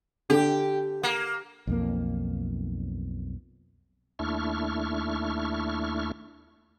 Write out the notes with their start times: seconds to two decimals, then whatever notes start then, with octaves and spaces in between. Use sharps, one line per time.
0.30 D3 G4
1.03 A#3
1.67 B1 F2 A#3
4.19 D#2 A3 D4 E4 C#6 F6